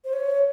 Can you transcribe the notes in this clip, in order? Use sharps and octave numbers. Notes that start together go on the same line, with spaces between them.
C5
C#5